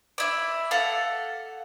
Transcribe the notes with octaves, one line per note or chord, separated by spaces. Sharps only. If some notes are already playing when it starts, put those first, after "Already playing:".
E4 D5
A4 F5 F#5